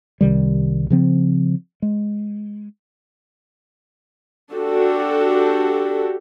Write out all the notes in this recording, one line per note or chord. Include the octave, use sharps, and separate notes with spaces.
C2 C3 D#3 G3
C#3 F3 C4
G#3
D4 F#4 G4 A4